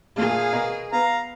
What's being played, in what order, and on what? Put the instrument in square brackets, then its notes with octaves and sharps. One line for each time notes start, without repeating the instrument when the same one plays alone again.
[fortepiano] A#2 A3 [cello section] G#4 [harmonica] F5
[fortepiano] B2 A#4
[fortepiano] B3 [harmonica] F5 A#5